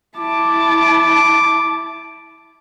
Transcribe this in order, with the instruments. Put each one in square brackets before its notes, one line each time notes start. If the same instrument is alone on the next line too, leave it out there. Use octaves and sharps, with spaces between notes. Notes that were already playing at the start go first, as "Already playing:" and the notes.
[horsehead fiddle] E4 A5 [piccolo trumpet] D6